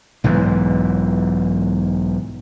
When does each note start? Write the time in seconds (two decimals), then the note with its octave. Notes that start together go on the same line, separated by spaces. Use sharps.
0.24 B1 G#2 E3